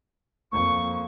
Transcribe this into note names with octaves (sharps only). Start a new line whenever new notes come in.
F2 A#3 C#6